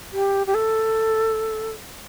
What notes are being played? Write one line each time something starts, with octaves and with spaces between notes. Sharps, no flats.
G4
G4
A4